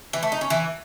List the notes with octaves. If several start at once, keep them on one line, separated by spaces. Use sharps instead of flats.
E3
A3
D#4
C#4
E3